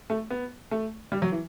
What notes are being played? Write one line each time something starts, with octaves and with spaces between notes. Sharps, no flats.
A3
B3
A3
G3
F#3
E3